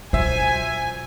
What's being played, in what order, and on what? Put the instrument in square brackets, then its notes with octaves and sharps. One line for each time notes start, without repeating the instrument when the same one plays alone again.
[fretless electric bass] B2 F#3 [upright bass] F4 [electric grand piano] C5 E5 [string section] G#5